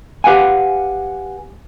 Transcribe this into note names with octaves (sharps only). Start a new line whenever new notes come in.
G4 B4 F5 F#5 G#5